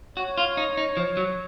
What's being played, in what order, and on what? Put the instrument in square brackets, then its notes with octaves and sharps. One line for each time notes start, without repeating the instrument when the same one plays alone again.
[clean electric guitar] F#4 [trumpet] C#5
[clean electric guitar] F4
D#4
D#4
F3
F#3